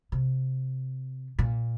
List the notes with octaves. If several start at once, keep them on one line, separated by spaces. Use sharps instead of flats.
C3
A#2